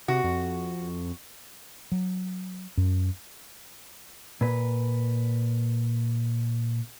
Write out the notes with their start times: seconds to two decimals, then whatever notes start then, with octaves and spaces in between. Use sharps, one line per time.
0.08 C3 F#4
0.24 F2
1.92 F#3
2.77 F#2
4.41 A#2 B4